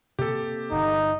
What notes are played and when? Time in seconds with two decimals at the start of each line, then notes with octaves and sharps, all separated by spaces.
0.19 C3 A#3 G4 A4
0.71 G1 D#4